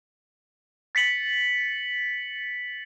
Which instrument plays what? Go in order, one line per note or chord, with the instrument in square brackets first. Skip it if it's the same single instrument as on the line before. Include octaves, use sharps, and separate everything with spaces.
[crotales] A6 B6 C#7 F#7